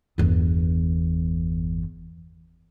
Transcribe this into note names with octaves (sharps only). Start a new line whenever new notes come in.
G1 E2